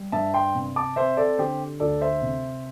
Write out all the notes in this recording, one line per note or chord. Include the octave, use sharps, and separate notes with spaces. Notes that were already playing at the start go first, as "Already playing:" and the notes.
Already playing: G3
G2 E5 A5
G5 C6
C3
A5 D6
C4 C5 E5
A4 D5
D3 G4 C5
D2 A4 D5
C5 E5
C3